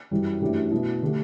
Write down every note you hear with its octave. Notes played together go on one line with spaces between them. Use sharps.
F#2 E3 G3
F#2 E3 A3 D4 G4
B2 F#3 A3 E4
D3 A3 D4 G4